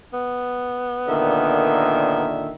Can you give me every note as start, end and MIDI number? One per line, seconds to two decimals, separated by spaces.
0.13 2.24 59
1.07 2.51 46
1.07 2.51 50
1.07 2.51 51
1.07 2.52 70
1.07 2.52 76